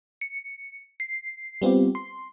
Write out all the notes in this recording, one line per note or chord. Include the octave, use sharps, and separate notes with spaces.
C#7
C7
G3 B3 C4 F4 G4
C6